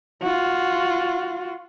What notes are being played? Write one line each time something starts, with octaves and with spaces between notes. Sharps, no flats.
F4 F#4